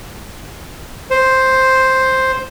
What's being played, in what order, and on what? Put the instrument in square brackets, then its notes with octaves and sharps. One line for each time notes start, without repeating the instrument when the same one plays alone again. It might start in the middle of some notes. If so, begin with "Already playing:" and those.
[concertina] C5